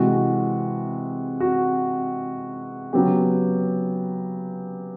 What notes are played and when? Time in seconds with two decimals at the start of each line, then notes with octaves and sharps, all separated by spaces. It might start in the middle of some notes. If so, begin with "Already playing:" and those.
Already playing: C3 E3 G#3 F#4
1.40 F#4
2.93 C#3 F#3 B3 G4